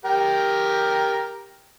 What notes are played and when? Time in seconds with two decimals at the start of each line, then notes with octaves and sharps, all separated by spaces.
0.05 G4 A#4 G5